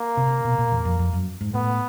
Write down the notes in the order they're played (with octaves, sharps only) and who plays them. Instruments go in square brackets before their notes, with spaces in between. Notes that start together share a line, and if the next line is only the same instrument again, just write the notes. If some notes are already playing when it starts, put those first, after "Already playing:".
Already playing: [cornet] A#3
[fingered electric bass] C3
B2
A#2
E2
F2
F2
F#2
G#2
[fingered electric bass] A2 [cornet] B3